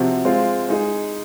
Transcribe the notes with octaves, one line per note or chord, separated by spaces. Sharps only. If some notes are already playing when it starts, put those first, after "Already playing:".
Already playing: C3 F3 C4 F#4
G#3 C4 F4
G#3 D#4 G#4